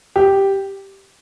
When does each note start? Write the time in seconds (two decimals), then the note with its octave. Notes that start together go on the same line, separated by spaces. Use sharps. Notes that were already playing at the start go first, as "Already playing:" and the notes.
0.16 G4